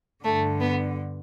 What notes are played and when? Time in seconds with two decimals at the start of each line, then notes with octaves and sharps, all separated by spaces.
0.23 G2 D3 A3
0.60 B3